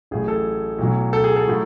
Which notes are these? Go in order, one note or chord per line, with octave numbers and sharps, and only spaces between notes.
A1 A2 F#3 G#4
A4
B1 A2 F#3
A4
G#4
A4
A2 F#3